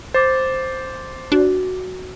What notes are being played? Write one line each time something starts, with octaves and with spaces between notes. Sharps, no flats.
C5 D6 A6
D4 F#4